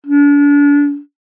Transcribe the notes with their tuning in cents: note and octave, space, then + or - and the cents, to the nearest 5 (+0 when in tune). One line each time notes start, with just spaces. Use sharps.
D4 -35